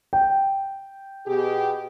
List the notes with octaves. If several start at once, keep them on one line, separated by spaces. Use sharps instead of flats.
G5
B2 G4 G#4